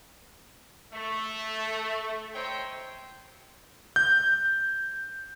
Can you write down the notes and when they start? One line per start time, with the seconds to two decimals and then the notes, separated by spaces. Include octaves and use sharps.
0.93 A3
2.34 D#4 C5 C#5 E5 G5
3.96 G6